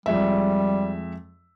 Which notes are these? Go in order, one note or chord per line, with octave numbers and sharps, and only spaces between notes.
F2 G3 G#3 E5